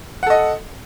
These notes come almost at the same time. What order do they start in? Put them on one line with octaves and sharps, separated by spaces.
F#5 A4 D#5